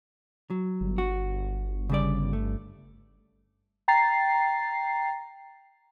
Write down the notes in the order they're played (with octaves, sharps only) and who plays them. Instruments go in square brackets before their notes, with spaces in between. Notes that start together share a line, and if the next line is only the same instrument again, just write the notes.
[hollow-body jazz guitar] F#3
[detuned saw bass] G1
[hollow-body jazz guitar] F#4
C#3 G3 D5
A3
[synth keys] G5 A#5 A6 C7